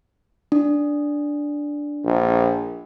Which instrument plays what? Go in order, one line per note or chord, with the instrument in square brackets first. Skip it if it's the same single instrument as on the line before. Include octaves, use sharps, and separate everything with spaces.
[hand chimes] D4
[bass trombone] A#1